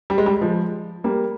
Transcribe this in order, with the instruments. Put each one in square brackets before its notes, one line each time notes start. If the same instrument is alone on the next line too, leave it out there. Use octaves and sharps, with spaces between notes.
[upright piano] G3
G#3
G3
F3 G#3
G3 A#3